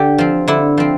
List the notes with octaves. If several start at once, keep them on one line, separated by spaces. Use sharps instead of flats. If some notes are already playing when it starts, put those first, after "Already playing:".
Already playing: D3 G4
F3 C4
D3 E4
F3 C4